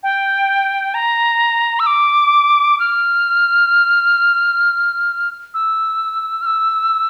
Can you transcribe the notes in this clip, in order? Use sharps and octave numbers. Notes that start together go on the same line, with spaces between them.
G5
A#5
E6
D6
F6
E6
F6
E6